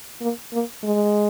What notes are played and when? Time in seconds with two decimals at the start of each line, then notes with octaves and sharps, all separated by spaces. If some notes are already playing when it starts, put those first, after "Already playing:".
0.21 A#3
0.53 A#3
0.84 G#3